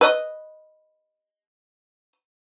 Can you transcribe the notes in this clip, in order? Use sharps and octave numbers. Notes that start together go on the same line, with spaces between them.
B4 D#5